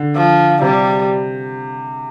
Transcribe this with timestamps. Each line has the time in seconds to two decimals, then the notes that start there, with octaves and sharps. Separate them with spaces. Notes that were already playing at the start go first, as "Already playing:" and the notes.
Already playing: D3
0.16 F3
0.62 C3 G3